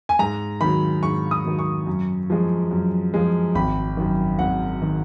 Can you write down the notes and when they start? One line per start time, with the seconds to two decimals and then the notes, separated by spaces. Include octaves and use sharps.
0.09 G#5
0.19 G#2 A#5
0.61 D#3 F#3 B5
1.03 G#2 C#6
1.31 D#6
1.45 D#3 F#3
1.59 C#6
1.87 F#2
2.30 F3 G#3
2.71 F#2
3.14 F3 G#3
3.55 G#1 B5
3.97 F#2 D#3
4.39 G#1 F#5
4.82 D#3